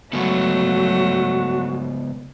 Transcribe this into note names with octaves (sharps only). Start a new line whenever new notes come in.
C#3 F#3 G#3 A3 B3 F#4